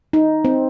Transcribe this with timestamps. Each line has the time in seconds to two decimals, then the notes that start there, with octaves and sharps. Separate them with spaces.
0.13 D#4
0.45 C4